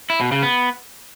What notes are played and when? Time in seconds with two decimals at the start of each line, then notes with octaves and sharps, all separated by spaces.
0.10 E4
0.21 B2
0.32 C#3
0.43 B3